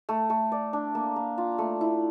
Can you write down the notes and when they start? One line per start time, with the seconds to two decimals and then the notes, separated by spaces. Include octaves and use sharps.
0.09 A3
0.30 A3
0.52 D5
0.73 D4
0.95 A#3
1.16 A#3
1.38 F4
1.58 A3
1.81 E4